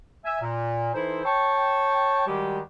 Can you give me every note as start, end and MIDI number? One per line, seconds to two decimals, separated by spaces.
0.25 0.40 76
0.25 0.40 80
0.41 0.90 46
0.94 1.21 52
0.94 1.21 63
0.94 1.21 64
0.94 1.21 69
0.94 1.21 72
1.24 2.25 73
1.24 2.25 79
1.24 2.25 81
1.24 2.25 85
2.27 2.60 51
2.27 2.60 55
2.27 2.60 56
2.27 2.60 66
2.27 2.60 67